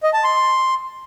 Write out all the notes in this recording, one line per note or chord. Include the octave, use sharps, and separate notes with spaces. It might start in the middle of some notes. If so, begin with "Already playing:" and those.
D#5
A5
C6